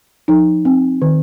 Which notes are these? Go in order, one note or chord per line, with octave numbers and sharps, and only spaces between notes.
F3 D#4
C4
D#3